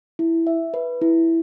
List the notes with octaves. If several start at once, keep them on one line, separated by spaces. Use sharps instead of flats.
E4
E5
B4
E4